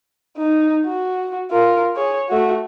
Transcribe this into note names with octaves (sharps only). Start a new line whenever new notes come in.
D#4
F#4
F4 A#4
G#4 C#5
A3 F#4